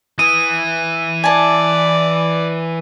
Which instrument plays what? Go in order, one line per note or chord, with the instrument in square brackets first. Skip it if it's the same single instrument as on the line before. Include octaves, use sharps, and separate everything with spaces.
[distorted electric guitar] E3 [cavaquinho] D#6 [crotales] D#7
[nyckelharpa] D5 [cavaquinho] G#5 A5